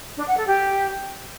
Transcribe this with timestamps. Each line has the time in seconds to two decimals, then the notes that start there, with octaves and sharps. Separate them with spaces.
0.17 D4
0.27 F#5
0.37 A4
0.46 G4